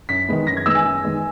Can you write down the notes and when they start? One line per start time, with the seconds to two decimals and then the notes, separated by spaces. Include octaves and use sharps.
0.09 F#2 B6
0.29 D#3 G#3 B3
0.47 F#2 A#6
0.57 G#6
0.66 D#3 G#3 B3 E6
0.75 G#5
0.85 F#2
1.03 D#3 G#3 B3